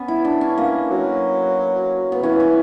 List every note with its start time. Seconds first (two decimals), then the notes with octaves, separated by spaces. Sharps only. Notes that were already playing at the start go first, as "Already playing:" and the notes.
Already playing: B3 C#4
0.08 E4
0.25 D4
0.41 C#4
0.58 A#3
0.91 F#3
2.12 B3
2.23 E3 C#4
2.40 C#4